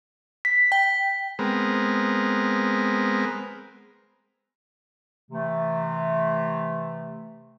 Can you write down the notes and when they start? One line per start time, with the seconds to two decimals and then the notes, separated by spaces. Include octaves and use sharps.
0.45 B6
0.72 G5
1.39 G#3 B3 C4 A#4
5.30 C3 E3 A3